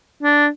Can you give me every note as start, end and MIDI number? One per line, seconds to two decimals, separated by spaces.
0.23 0.48 62